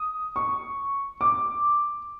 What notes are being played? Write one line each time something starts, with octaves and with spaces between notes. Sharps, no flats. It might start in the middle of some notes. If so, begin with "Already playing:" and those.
Already playing: D#6
C#6
D6